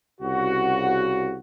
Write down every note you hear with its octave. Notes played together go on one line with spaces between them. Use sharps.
C2 C#3 F#4